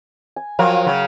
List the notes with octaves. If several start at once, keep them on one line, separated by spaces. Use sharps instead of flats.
G#5
F3 F#3 A#4 F5 G5
C#3 F#3